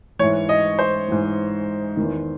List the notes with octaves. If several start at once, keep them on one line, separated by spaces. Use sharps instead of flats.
G#2 E3 C#5
D#5
C5
G#2 E3
E2 D#3